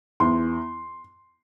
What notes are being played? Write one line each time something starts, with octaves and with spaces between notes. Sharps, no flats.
E2 C6